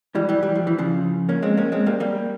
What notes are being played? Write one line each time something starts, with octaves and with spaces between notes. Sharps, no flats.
E3 G3
E3 G3
G3
F3
E3
C#3 F3
A#3 C#4
G#3 C4
A#3 C#4
G#3 C4
G3 A#3
G3 A#3